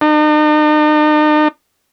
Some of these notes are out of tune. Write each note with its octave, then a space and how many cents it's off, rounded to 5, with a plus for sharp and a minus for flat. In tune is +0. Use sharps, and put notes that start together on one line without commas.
D#4 -45